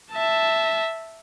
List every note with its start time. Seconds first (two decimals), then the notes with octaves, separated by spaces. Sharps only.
0.12 E5 A5